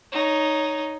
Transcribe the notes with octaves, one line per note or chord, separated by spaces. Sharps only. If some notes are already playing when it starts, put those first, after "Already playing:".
D#4 C#5